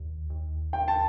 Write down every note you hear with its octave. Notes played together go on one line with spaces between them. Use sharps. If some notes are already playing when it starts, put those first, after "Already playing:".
Already playing: D#2
D#2
D#2 G5
A5